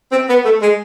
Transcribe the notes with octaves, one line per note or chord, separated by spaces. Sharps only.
C4
B3
A3
G#3